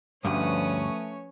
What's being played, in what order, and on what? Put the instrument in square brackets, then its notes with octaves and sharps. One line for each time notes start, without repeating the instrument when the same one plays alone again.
[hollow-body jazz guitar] D2 G2 [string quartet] F3 B4 D#6 [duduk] A3 [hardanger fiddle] C#4 C#5